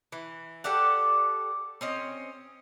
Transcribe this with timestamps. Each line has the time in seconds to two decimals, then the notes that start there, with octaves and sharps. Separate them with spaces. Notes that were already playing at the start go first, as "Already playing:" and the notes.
0.12 E3
0.64 G4 A4 D5 F#5
1.81 C4 C#4 D#5